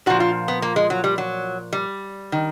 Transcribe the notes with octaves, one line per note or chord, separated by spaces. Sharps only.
A#2 F3 F#4
F4
B3
A#3
G#3
F#3
G3
F#3
G3
D#3